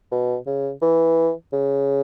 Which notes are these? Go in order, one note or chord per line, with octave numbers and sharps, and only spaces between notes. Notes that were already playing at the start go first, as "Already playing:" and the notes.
B2
C#3
E3
C#3